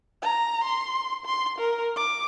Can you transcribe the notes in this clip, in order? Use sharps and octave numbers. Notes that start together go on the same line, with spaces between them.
A#5
C6
C6
A#4
D6